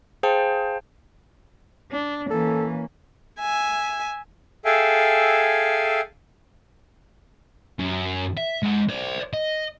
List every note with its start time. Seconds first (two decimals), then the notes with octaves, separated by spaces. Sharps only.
0.23 G#4 C5 F5 G5 A5
1.91 D4
2.30 E3 A#3 C#4 A4
3.39 E5 G#5
4.65 G#4 A4 E5 F5 G5 G#5
7.79 F#2
8.37 E5
8.63 G#3 F#5
8.89 C5 D5
9.33 D#5